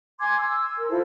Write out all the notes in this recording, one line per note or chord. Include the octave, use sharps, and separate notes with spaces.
G#5 C6 D6 G#6
E6
A#4
E4 F4 A4 C5